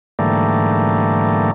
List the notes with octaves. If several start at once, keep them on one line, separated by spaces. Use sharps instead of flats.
G#2 D3 E3 G3 A3 A#3